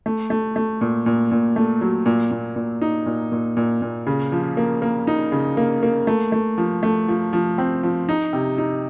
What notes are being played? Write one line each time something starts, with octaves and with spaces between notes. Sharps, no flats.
A3
A3
A3
A#2
A#2
A#2
A3
F#3
A#2
A#2
A#2
D#4
A#2
A#2
A#2
A#2
C#3
F3
A#3
A#3
D#4
C#3
A#3
A#3
A3
A3
F3
A3
F3
F3
C4
F3
D#4
C3
D#4